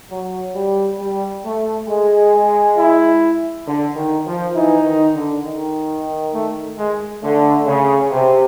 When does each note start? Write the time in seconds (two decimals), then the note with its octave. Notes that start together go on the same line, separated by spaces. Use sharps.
0.10 F#3
0.55 G3
1.00 G3
1.44 A3
1.88 G#3
2.77 E4
3.66 D3
3.96 D#3
4.26 F3
4.55 E3 D#4
4.85 D#3
5.15 D3
5.45 D#3
6.34 A3
6.78 G#3
7.23 D3 A3
7.67 C#3
8.11 C3